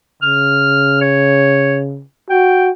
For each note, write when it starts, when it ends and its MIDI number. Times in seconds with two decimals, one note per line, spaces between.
0.23 2.04 49
0.23 0.98 89
1.01 1.80 73
2.30 2.71 66
2.30 2.68 79